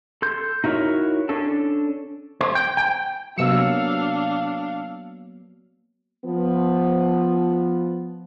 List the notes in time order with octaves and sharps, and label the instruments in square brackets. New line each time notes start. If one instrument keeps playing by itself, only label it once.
[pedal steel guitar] A4 C6 G6
D#4 E4 F#4 A#4 C#5
C#4 D4 A4 A5
[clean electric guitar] C5
G5
G5
[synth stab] C3 E6 C#7 [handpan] F#3 A#3 B3 [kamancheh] D4 F5
[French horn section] F3 B3